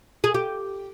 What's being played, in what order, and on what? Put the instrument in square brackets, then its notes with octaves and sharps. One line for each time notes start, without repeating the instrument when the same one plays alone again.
[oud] G#4
G4